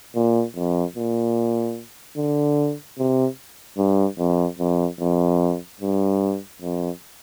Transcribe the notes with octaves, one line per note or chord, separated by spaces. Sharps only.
A#2
F2
A#2
D3
C3
G2
F2
F2
F2
G2
F2